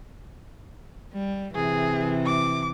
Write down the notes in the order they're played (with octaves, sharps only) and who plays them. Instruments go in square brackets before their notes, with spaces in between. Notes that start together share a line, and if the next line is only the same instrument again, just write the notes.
[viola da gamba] G3
[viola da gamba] C3 E3 [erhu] G#4
[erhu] D6